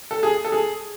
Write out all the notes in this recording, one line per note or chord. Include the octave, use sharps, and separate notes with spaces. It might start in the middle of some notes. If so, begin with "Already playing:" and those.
A4
G#4
A4
G#4